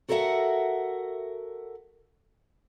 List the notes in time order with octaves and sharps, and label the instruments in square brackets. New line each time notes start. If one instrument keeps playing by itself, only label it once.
[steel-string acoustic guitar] F#4 A4 A#4 C5 E5 F#5